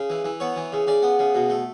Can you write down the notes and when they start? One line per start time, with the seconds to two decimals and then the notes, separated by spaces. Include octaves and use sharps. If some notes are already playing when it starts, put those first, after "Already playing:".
Already playing: C#3
0.10 E3
0.25 E3
0.40 B3 C#5
0.56 E3
0.72 C#3
0.87 C#3 D5
1.03 B3
1.19 C#3
1.35 B2
1.50 A3